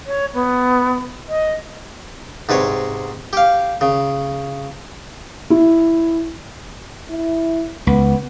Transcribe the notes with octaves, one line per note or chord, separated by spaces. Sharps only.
C#5
B3
D#5
G#2 C3 B4 C#5
G4 F5
C#3
E4
E4
C#2 B3